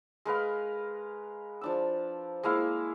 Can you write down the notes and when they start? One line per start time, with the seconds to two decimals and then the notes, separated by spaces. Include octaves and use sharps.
0.25 G#3 A#4 B4 F5
1.61 F3 D4 E6
2.43 G#3 A#3 E4 F5